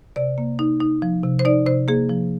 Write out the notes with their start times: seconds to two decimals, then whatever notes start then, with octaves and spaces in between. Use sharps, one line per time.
0.16 C3 D5
0.38 A#3
0.59 D#4
0.80 D#4
1.02 F3
1.23 C3
1.39 C5
1.45 D#4 D5
1.66 C3 C5
1.88 A#3 G#4
2.09 F3